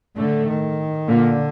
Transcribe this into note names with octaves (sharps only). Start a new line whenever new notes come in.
A2 D3 A3
D#3
A#2 D3 A#3